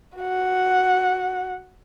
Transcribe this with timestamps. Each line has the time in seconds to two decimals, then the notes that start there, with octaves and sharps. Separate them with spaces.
0.17 F#4 F#5